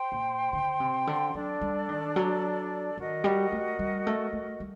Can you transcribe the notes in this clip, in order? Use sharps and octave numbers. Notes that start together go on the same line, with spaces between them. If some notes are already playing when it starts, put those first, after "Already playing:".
Already playing: C5 G5 C6
A#2
D3
C3
D3
F#3 D4 A4 D5
G3
D#3
F#3
D#3 F#4 A#4 D#5
G3
A3
G3
A3
A3
G3